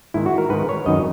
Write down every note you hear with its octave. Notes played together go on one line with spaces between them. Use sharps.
G#2 D#3 E4
F#4
A#4
G#2 D#3 B4
C#5
F#2 D#3 D#5